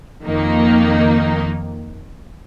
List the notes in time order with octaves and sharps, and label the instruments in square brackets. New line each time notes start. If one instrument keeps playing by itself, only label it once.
[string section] F2 D#3 A#3 D#4